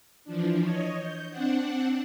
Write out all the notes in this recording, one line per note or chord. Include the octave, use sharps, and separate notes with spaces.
E3 F3 D4
C#5 D#5
G6
C4 D4 F#5